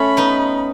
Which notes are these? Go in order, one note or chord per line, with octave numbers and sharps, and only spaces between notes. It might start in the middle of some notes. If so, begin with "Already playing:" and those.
Already playing: A3 C#4 B5
B3 D#4